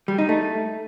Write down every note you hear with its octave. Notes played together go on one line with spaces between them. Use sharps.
G3
D#4
A3